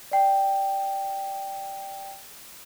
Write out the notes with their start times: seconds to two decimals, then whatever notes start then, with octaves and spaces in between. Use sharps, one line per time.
0.11 D5 G5